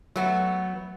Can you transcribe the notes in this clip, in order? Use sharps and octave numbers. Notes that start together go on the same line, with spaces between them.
F#3 A3 B3 F#4